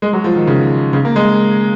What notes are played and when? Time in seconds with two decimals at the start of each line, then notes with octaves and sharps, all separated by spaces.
0.02 G#3
0.13 F#3
0.24 F3
0.36 D#3
0.47 C#3
0.93 C#3
1.05 A#3
1.16 G#3